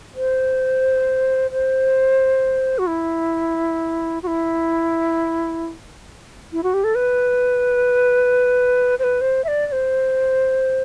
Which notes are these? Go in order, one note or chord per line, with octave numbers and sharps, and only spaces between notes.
C5
C5
F#4
E4
F#4
E4
E4
F#4
G4
A4
B4
C5
B4
C5
E5
D5
D5
C5